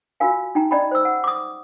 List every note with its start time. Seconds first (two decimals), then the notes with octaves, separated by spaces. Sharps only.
0.20 F4 F#4 A#4 F5 G#5
0.55 D#4 G5 A#5
0.71 C#4 D5 D#5 G5 A#5 B5
0.91 C5 E6
1.05 F#5
1.24 D6 D#6